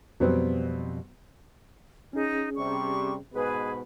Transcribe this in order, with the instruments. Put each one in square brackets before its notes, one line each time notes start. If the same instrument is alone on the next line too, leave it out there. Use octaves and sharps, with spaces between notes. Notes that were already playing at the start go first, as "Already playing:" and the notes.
[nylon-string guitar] F2 B2 G3 [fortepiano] F#3 B3 C4
[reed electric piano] C#4 G#4 [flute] D#4
[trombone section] C3 G3 [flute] C#6
[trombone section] G#2 B2 B4 [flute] G#4